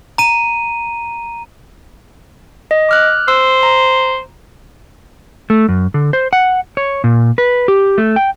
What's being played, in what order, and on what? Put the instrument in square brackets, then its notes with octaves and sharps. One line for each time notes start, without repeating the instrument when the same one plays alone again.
[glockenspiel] A#5 D#7
[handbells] D#5
D6 F6 F#6
[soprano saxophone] C5 [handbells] E6
[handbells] A#5
[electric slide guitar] A3
F#2
D3
C5
F#5
C#5
A#2
B4
G4
A3
G5